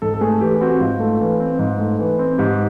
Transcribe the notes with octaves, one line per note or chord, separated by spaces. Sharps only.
G#2 A4
A4
A3 G#4
E3 G4
C4 F#4
G#2 F4
A3
E3
C4
G#2
A3
E3
C4
G#2 G4